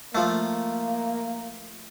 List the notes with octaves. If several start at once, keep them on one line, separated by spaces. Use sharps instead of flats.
F3 A3 A#3